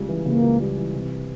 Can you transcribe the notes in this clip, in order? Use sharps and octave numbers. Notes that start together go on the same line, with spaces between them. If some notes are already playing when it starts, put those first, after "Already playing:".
Already playing: C#2 C#3 G3
E3
C#3 A#3
C#2
G3
E3
C3